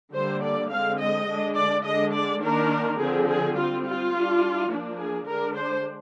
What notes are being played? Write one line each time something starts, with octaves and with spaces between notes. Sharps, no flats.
D3 G3 A#3 D4 C5
D5
D3 G#3 C4 F5
D#5
D3 G#3 D4
D5
D3 G#3 D4 D#5
D5
D#3 A#3 D4 A#4
D3 F3 C4 G#4
G#4
G3 C4 F4
F4
G3 D4
F3 A#3 D4
G#4
D3 G#3 D4 A#4
C5